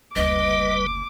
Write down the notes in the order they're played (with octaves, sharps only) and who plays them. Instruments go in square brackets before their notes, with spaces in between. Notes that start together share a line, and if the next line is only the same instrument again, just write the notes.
[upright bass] F#1 D2 [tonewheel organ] G3 B4 [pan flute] D#5 [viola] D6